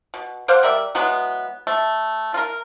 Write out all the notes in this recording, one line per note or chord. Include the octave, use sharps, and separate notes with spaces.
B2
C5 D5 F5 F#5
G3 A#4 D5 E5
E3 F#3 G#3 B3
A3
F4 A#4